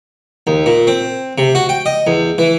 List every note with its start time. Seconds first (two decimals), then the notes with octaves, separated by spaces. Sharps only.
0.47 D#2
0.66 A#2
0.87 C4
1.38 C3
1.55 F#4
1.69 G5
1.86 D#5
2.07 E2
2.38 E3